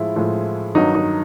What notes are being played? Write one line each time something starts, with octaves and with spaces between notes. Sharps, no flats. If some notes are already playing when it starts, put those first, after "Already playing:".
Already playing: A2 F3 G#3 E4
A2 F3 G#3
G2 D#3 F#3 D#4
D#4